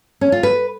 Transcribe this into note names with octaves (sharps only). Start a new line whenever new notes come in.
C#4
F4
B4